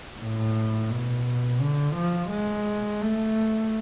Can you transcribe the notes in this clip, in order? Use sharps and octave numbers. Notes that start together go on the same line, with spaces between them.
A2
B2
D3
F3
G#3
A3